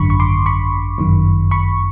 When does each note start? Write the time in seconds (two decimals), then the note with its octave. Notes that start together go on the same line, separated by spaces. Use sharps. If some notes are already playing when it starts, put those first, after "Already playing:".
Already playing: G#1 F#2 D3 B5 C#6
0.10 C#6
0.20 C6 D6
0.46 B5 C#6
0.98 G1 F#2 D#3
1.51 B5 C#6